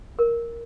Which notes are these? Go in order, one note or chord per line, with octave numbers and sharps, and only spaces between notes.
A#4